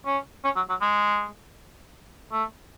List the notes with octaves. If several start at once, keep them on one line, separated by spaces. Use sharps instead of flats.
C#4
C#4
F#3
F#3
G#3
A3